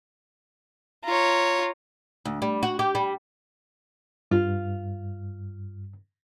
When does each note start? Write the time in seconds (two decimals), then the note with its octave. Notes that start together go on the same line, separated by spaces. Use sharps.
1.05 F4 C#5 A#5
2.25 D2
2.42 G3
2.63 F#4
2.79 G4
2.95 G3
4.31 G2 F4